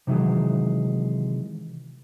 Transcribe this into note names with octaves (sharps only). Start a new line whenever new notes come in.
C3 D#3 E3 F#3 G#3